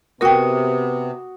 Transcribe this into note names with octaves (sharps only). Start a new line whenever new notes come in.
C3 B3 F#4 A#4 G5 D#6